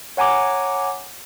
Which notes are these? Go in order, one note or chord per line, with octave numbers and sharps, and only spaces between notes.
C#5 F#5 G#5 A#5 D6